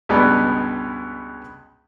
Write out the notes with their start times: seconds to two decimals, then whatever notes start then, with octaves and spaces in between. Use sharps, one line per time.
0.09 C#2 G2 B2 G#3 B3 D5